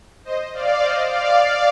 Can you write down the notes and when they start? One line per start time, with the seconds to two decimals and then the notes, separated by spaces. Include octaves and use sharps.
0.24 C5 D#5
0.54 D5 F5
0.82 C5 D#5
1.11 D5 F5
1.39 D5 F5